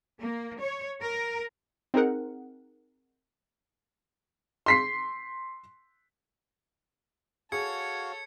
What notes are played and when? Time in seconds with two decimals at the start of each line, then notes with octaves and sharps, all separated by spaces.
0.20 A#3
0.59 C#5
1.01 A#4
1.94 C4 D#4 G#4 A#4 F#5
4.66 C6 B6 C7
7.52 F#4 G#4 A4 C#5 F5 G#6 C#7